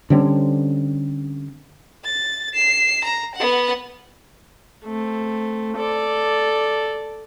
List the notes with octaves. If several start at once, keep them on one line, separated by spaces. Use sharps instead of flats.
D3 G3 C4 C#4
A6
C7 E7
A#5
B3 F#5
A3 C4
A4 D5